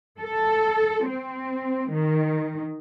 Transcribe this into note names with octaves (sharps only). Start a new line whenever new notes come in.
A4
C4
D#3